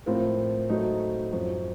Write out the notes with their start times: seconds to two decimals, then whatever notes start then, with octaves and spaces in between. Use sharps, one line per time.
0.06 A2 F3 C4 F4 A#4
0.69 F#3 A3 C4 D#4 F#4
1.32 F#2 F3 C4